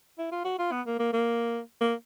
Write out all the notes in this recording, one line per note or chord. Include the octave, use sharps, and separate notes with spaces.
E4
F4
F#4
F4
B3
A#3
A#3
A#3
A#3